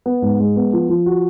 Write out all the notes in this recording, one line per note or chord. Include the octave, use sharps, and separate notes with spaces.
B3
G#2
G#3
B3
F3
F3
F#4